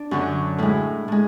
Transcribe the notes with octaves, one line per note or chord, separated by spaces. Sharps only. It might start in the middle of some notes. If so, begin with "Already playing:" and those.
Already playing: D4
F#2 D3 F#3
A2 G#3 E4
A2 G#3